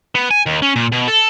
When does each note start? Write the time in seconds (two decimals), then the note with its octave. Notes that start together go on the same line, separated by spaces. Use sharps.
0.15 B3
0.31 G#5
0.46 D#2
0.62 C#4
0.76 A#2
0.92 B2
1.07 A4